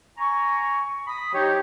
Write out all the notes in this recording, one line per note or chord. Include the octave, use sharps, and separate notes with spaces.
G#5 A#5 C#6
B5 D#6
F3 D#4 G4 C#5